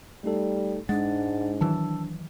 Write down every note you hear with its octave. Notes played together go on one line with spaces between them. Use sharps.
G3 A3 D#4 A4
G#2 G#3 D4 F#5 A6
D#3 E3 F#3 A5 E6